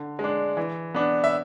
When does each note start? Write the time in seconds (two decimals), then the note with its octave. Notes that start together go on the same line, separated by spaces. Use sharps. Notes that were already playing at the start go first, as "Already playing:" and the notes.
Already playing: D3
0.19 G#3
0.24 D4
0.57 E3
0.95 B3 D4
1.24 E5